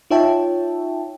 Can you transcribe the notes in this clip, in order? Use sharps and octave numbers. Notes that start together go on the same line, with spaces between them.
D#4 F4 C#5 E5 G5 A5